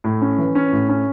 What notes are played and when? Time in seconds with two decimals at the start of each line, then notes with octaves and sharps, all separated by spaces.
0.04 A2
0.21 C#4
0.39 E3
0.55 C#4
0.72 A2
0.89 C#4